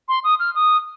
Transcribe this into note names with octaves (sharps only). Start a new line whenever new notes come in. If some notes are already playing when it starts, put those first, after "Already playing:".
C6
D#6
F6
D#6